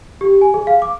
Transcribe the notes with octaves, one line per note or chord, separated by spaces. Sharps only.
G4
G#5
G#4
F5
D6